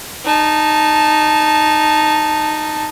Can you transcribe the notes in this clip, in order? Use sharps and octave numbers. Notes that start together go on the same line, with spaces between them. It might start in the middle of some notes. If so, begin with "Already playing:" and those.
D#4 A5